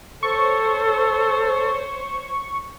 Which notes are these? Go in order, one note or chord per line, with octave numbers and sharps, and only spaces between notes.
A4 C5 C#5 C#6